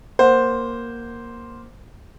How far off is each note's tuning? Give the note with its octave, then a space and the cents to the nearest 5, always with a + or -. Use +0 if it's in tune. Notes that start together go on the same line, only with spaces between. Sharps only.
A#3 +5 C5 +0 F#5 +0